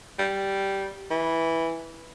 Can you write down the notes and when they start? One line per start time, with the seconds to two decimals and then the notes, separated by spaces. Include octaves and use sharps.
0.19 G3
1.11 E3